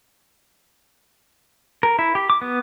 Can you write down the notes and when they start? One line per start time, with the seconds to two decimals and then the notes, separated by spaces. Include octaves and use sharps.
1.83 A#4
1.99 E4
2.15 G4
2.30 D6
2.41 B3